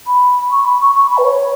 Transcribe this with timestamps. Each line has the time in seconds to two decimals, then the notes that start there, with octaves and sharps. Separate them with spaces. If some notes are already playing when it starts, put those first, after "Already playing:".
0.07 B5
0.51 C#6
0.65 B5
0.81 C#6
0.95 C#6
1.10 B5
1.18 B4
1.25 C#5